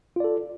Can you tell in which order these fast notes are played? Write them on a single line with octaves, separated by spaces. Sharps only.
F4 D5 A4